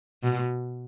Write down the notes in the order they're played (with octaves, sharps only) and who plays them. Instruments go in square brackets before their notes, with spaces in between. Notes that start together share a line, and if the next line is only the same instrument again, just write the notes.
[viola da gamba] B2